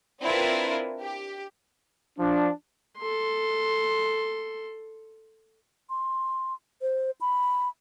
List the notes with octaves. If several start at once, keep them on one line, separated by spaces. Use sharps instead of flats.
C4 D4 E4 F4 A#4 B4
G4
F3 D4
A4 C6
C6
C5
B5